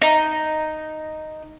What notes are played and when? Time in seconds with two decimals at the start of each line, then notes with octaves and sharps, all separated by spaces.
0.02 D#4